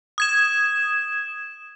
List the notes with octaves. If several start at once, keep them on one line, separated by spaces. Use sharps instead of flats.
D#6 G#6 E7